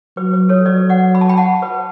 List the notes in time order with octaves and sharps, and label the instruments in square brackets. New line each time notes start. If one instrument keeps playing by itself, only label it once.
[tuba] F#3 [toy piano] B4
[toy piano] B4
A4 C#5
[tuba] F#3 [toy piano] B4 D5
[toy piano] D5 F#5
B5
A5
G5 B5
F#5 A5
B4